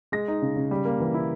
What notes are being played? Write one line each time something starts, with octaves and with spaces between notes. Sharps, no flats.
G#3 A#6
D#4
C#3
C#3
G3
A#3
E3
E4